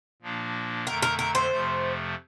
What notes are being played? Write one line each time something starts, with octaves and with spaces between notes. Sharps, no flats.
A#2 F3 A#3 D4
F2 D3 A3 A#4
A#4
A#4
C5
F2 C3 F3 A3